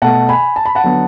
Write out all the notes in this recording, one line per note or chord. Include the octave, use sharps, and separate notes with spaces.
B2 A3 F#5 A5
G#5 B5
A5
B5
F#5 A5
D3 F#3 B3